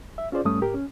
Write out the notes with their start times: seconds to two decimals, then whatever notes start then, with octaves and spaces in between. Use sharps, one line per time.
0.18 E5
0.32 C#4 F4 G#4 C5 D5
0.45 G2 G3 A3 C#4 D#6
0.62 G#2 G4 A#4
0.74 C#4